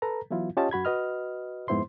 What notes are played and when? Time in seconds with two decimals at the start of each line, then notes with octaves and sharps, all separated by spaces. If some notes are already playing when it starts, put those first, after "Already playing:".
0.02 A4 B4 A#5
0.31 E3 F#3 B3 E4 F4
0.57 C#4 F4 G4 C#5 D#5 A5
0.71 F#2 F#4 B5 G#6
0.85 F#4 B4 D#5 F6
1.68 F2 G#2 B3 E4 C5 C6